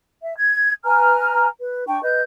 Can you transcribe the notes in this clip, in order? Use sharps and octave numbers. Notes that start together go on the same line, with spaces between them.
E5
G#6
B4 G#5 A#5 F6
B4
D4 G5 C#6
B4 D#5 G6